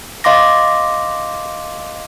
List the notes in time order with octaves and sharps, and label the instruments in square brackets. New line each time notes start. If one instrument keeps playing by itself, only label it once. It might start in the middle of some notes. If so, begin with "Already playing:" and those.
[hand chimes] D#5 F5 C6 D6 A#6